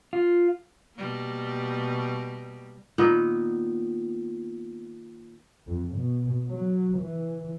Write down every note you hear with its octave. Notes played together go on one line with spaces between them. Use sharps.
F4
B2 G3 A#3
A#2 D#3 B3
F2
B2
F#3
E3